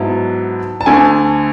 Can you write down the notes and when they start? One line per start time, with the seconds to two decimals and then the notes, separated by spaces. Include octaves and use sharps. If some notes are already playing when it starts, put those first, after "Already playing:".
Already playing: G#2 F#3 B3 E4 A5
0.81 A5
0.86 D2 D3 A3 G#5